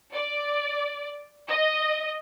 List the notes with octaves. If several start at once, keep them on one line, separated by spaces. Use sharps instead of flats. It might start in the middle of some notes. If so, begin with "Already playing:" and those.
D5
D#5